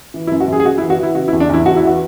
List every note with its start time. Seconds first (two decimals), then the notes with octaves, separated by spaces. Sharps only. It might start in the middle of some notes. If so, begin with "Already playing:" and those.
0.14 E3
0.27 E4
0.32 F#2
0.40 F#4
0.48 F#2 G#4
0.60 G#4
0.65 F#2 F#4
0.78 E4
0.82 E3
0.90 F#4
0.98 E3 E4
1.15 C#3 F#4
1.28 E4
1.33 E2
1.40 D4
1.49 E2 E4
1.66 E2 F#4
1.76 E4
1.83 E3 F#4